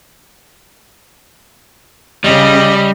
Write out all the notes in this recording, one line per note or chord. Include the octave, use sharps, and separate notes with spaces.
C#3 G3 D#5